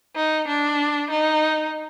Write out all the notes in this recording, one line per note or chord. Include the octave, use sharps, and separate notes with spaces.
D#4
D4
D#4